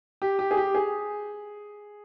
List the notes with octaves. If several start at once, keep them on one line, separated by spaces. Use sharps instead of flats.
G4
G4
G#4
G4
G#4